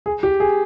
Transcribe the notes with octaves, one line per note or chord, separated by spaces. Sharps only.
G#4
G4
G#4